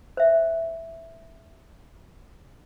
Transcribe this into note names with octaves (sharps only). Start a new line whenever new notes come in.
C5 E5